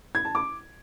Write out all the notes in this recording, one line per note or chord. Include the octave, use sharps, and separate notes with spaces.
G#6
A5
D6